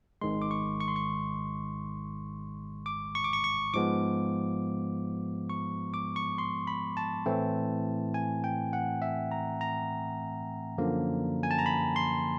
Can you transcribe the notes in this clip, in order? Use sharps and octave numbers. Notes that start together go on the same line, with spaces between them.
G#1 G#2 D#3 G#3 C6
D6
C#6
C#6
C6
C#6
D6
C#6
D6
C#6
C#6
G#2 F3 G#3 B3 D6
C#6
D6
C#6
C6
B5
A5
A2 E3 A3 C4
G#5
G5
F#5
E5
A#5
A#5
F#2 D3 F3 A#3
G#5
A5
A#5
B5
C6